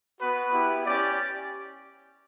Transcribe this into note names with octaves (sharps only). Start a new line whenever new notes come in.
B3 F#4 B4
B3 E4 G4
C#4 G4 D5